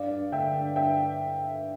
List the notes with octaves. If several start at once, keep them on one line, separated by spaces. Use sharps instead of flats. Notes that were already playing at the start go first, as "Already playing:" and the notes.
Already playing: G2 D5 F5
G2
D3 E5 G5
G2
G2 E5 G5